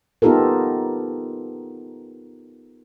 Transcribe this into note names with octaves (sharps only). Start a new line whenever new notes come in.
B3 D#4 F4 G4 A4 A#4